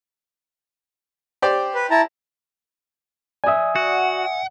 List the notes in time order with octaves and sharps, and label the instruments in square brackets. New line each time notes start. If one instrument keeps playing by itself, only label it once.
[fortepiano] G4 C5 D5
[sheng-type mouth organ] B4
E4 A5 A#5
[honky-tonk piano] D5 D#6 [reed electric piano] E5 G#5
[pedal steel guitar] F#4 [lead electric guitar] F#5